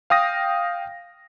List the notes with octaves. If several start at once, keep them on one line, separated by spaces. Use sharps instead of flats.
F5 G5 D#6 A#6